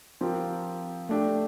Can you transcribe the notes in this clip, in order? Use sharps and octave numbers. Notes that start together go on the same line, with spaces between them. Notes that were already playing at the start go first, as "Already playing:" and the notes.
F3 C4 G4 A#4
A3 D4 G4